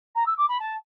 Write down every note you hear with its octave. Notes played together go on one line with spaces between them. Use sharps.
A#5
E6
D6
B5
A5